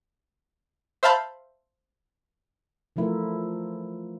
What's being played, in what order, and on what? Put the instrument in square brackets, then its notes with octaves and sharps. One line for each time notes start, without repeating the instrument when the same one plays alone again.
[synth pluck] C5 E5 F5 A5 B5 G6
[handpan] E3 F3 A3 E4 F4 A#4